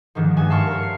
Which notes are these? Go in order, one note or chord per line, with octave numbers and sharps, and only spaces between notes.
G#2 D#3 F3
G2 G#3 F#4 G#5
E5 F5 A5 C6 C#6 F6
A#4 C#5
C7